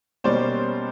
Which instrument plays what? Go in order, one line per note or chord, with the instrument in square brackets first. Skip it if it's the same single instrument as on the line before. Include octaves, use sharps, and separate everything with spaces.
[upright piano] B2 G3 A#3 C#4 C5 D5